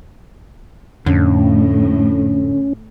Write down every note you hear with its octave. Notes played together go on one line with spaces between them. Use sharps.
F2 A2 D3 C#4